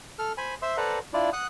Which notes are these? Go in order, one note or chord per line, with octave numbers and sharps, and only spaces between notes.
A4 F6
C5 G#5 B5
C5 E5 C6 E6
A4 B4 C5 D5 F#5 A#5
D4 E4 F4 D5
F#5 D#6 F#6